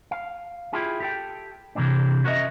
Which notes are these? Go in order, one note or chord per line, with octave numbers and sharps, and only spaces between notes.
F5
E4 F4 G4 G#4
G4 A4 G5
C3 E3 A#3 C4 D4
C#4 F#4 A#4 C5 D#5 E5